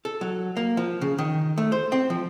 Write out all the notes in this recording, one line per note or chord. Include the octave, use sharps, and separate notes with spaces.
A4
F#3
A#3
F3
C#3
D#3
A3
C5
C4
F3